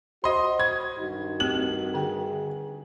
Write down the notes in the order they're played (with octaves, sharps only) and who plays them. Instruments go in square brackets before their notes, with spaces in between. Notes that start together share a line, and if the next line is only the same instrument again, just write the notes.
[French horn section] F#4 [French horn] C5 [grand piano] D#5 C6
[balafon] B5 C#6 [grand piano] G#6
[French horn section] G2 D#3 F#4 [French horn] D#4
[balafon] A3 C4 G4 [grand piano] F#7
[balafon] D3 G5 [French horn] G#4